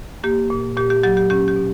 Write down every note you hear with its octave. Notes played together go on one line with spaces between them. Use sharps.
A#3 G4
A#2
A#2 G4
G4
F#3 G4
G4
C#4 G4
G4
B2